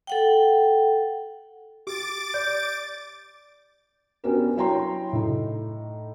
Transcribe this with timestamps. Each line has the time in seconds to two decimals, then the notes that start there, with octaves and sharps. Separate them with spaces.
0.07 A4 F#5 G5
1.87 G4 D6 A6
2.34 D5 G6
4.24 B3 C#4 D4 F#4 G4 A#4
4.56 F#3 E4 C#5 G5 A#5 C6
5.13 A2 D#4